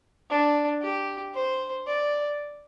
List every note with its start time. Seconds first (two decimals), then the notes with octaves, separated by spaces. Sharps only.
0.30 D4
0.82 G4
1.35 C5
1.87 D5